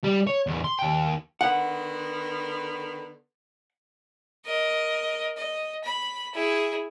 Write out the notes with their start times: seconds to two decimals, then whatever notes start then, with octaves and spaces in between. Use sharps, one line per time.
0.04 G3
0.27 C#5
0.47 E2 A2
0.64 C6
0.79 D#2 G5
1.41 D3 D#3 B3 F#5
4.46 A#4 D#5
5.37 D#5
5.84 B5
6.34 E4 G#4